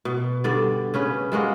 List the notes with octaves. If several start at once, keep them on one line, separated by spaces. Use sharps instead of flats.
B2
G2 D3 G3 D5
C#3 C#4 B4
G3 G#3 A#3 F#4